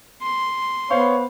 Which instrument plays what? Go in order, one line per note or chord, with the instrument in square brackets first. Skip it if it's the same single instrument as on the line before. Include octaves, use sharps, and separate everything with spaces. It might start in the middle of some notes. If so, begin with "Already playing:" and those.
[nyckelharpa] C6
[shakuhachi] B3 [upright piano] C5 F5 C#6 [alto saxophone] C#5